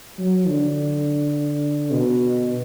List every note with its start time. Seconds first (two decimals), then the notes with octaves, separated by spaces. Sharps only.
0.18 F#3
0.48 D3
1.92 B2